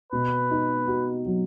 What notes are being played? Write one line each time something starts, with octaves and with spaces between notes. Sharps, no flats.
B2 B4
D#4
F#4
F#3